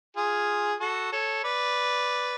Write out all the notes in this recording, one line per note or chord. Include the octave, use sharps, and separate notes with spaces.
F4 G#4
F#4 A4
A4 C#5
B4 D5